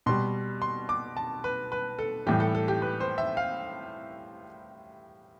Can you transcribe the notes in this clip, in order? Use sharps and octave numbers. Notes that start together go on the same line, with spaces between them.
B2 G3 C6
C6
D6
A5
B4
B4
A4
A2 E3 G3 G4
A4
A4
G4
B4
C5
E5
F5